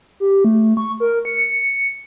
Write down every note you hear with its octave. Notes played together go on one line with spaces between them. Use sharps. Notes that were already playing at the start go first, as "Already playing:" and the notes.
G4
A3
C#6
A#4
C#7